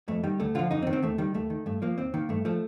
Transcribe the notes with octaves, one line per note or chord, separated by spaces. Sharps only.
F2 A3
D#3 G3
D2 A3
D3 F3 F4
F2 D#4
C4
D#3
C4
D#2 A3
D#3 G3
D#2 A3
D#3
G2 A3
F3 A#3
D#2 C4
D#3 A#3
G2 A3
F3 A3